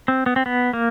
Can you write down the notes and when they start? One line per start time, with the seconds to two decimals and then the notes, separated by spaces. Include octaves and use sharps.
0.08 C4
0.26 B3
0.36 C4
0.46 B3
0.73 A#3